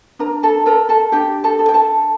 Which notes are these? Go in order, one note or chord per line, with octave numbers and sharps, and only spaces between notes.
D4 A#4 A#5
A4 A5
A4 A#4 A#5
A4 A5
D4 G4 G5
A4 A5
A4
G5
A4 A5